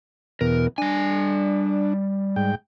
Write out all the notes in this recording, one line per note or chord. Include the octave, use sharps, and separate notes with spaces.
E2 B2 A#4
G3 D4 G#5
G#2 G5